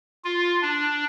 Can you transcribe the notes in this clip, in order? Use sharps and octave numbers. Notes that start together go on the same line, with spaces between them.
F4
D4